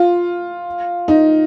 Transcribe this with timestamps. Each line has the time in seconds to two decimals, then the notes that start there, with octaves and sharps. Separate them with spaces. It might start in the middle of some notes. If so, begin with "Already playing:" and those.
Already playing: F4
1.08 D#4